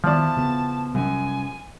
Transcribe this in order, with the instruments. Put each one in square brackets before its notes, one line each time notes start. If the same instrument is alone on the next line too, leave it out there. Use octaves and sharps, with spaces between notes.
[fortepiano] E2 B2 D5 [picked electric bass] D#3 [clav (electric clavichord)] F3 [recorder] A5
[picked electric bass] C#3 B3
[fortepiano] F#2 [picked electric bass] C3 G3 C#4 [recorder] G#5